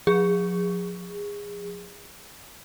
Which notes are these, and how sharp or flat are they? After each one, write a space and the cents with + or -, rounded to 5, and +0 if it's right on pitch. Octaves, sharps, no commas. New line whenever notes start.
F3 +40 G#4 -25